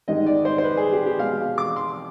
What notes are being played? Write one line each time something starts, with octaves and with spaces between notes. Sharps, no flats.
G#2 D#3 G3 D#5
D5
C5
C5
B4
G#4
G4
G4
B2 G#3 F5
D6
C6